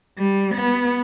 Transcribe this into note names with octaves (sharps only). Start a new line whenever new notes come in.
G3
B3